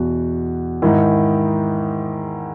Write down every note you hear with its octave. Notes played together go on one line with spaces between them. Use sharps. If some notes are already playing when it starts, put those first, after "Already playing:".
Already playing: E2 B2 F#4
G#2 D#3 E4